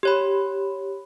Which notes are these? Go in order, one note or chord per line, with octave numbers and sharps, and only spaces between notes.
G4 C#5 B5